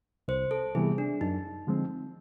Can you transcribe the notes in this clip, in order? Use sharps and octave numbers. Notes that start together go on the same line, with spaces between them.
C2 C5
A4
C3 E3 G3 B3 G#4
D4
F#2 D#4
D3 F3 G#3 C4